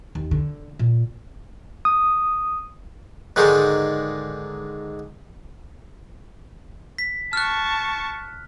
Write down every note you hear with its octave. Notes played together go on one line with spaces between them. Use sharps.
D#2
D3
A#2
D#6
G#2 D3 D#3 G#3 D4 D#4
B6
A5 C#6 F6 F#6